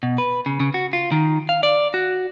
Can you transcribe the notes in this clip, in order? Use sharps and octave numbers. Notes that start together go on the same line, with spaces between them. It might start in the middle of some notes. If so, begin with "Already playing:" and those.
B2
B4
C#3
C#3
F#4
F4
D#3
F5
D5
F#4